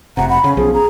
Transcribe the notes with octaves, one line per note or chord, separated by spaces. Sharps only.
F1 C3 F#5 A#5
F#5 B5
C#3 C#4
B1 F3 G#4
G#4 A#5